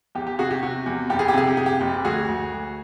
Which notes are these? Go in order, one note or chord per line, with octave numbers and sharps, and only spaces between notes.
E2 G4
G4
C3 F#4 G#4
G4
C3 F#4
E2
F#1 G4
G#4
G4
C3 G#4
G4
C3 G#4
G4
F#1
D2 F#4 G#4
D2
D2